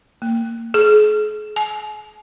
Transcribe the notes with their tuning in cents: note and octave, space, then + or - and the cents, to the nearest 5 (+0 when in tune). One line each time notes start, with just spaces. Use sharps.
A#3 -25
G#4 +40
G#5 +40